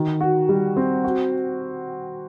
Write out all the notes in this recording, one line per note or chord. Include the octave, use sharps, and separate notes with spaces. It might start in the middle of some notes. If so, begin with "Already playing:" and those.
Already playing: D#3 F#4
F#4
G3
C4
F#4